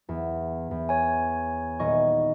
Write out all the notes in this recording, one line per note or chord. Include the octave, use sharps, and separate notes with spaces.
E2
E2
C#5 G#5
D#1 D#5 C#6